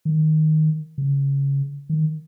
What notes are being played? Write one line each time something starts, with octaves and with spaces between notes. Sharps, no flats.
D#3
C#3
D#3